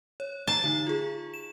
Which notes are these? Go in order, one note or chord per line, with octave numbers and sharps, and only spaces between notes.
C#5
A5 A#5 C7
D3 D#4
F4 G#4
E7